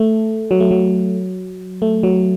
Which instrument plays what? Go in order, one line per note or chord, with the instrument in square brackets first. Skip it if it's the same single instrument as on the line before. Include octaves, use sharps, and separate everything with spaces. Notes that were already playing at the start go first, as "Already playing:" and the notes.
Already playing: [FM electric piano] A3
F#3
A3
F#3
A3
F#3